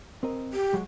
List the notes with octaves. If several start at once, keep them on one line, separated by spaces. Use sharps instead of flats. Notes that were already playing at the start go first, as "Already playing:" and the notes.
C4 A#4 D#5
G4
F#3 G#3 F#4